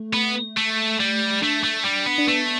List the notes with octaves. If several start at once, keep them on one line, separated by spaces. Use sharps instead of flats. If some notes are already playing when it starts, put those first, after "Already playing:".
Already playing: A3
B3
A3
G3
A3 D4
A3
G3
B3
D4
A3 B3